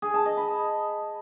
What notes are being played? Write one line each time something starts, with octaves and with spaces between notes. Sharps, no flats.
G#4
A5
D#5
B5